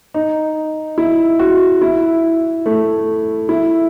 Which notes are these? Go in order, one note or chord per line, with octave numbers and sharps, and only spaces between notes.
D#4
E4
F#4
E4
A3
E4